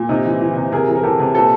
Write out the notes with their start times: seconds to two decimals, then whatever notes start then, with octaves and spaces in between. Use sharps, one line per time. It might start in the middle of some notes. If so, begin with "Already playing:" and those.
Already playing: A#2
0.09 C3 D#4
0.26 E3
0.41 E3
0.56 C3
0.72 C3 G#4 A#4
0.88 E3
0.96 A#4
1.03 E3 G4 A4
1.19 C3
1.35 A#2 A4 B4